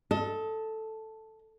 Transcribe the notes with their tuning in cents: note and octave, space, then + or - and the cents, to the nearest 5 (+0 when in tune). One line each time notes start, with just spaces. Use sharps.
A4 +0 D#5 +30